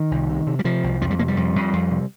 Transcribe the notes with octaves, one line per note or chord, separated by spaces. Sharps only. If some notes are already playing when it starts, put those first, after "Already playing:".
Already playing: D#3
C2
C3
C3
G3
C3 F3
C2
F2 F3
G3
C3 A#3
G3
F2
F2
F2
C3